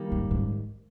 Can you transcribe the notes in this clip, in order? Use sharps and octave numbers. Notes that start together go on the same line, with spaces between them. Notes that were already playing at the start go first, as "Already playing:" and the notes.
Already playing: D#3 G3 A#3
G#2
G#2